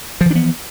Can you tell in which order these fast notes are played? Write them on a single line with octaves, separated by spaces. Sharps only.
F3 E3 D4 B3